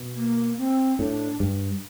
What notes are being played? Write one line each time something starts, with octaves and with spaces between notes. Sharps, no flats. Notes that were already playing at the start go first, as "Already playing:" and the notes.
Already playing: B2
A#3
C4
A2 D4
G2